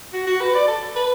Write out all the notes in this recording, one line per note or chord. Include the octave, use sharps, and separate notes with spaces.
F#4
F#4
B4
D5
A4
B4